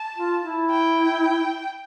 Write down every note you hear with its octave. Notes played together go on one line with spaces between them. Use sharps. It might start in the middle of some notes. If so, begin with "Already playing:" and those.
Already playing: A5
F4
E4
G5